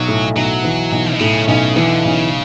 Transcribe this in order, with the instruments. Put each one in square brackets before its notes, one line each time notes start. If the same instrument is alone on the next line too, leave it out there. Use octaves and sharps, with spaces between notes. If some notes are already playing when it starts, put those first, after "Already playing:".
Already playing: [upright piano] B1 [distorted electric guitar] F#3
[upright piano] A2
[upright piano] B1 [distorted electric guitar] F#3
[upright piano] E3
B1
[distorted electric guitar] B2
[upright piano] A2 [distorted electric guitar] C#3
[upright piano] B1 [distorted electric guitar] C#3
[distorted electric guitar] D3 [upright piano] E3
[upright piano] B1 [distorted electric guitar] C#3